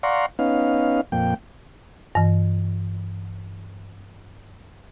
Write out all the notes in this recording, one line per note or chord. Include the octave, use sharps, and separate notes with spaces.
D5 F5 F#5 A#5 C6 C#6
B3 C#4 D#4 F5
F2 A#2 G5
G2 E3